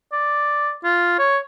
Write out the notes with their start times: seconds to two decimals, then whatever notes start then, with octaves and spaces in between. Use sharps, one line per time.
0.12 D5
0.84 F4
1.19 C#5